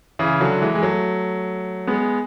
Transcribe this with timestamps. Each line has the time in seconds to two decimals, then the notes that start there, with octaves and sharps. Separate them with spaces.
0.19 C#3 E3
0.41 D3 F#3
0.62 E3 G#3
0.75 G#3
0.83 F#3 A3
1.87 G#3 B3